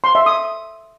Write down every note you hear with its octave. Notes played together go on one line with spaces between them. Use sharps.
C6
E5
D#6